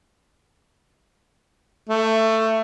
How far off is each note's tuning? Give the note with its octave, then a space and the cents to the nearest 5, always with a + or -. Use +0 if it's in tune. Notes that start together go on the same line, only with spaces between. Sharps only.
A3 +15